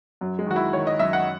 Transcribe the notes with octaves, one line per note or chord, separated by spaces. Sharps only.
F#2 F#3
G#3
D#3 F#4
E4
D#3 C#5
D#5
F#2 E5
F#5